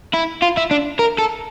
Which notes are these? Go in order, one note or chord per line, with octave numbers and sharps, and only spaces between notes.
E4
F4
E4
D4
A#4
A4